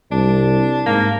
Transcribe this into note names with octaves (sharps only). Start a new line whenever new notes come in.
C2 D4
G#2 A#3